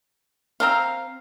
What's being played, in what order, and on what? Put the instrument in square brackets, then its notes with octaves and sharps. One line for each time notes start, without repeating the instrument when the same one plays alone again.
[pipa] C4 A#5 C6 [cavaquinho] F5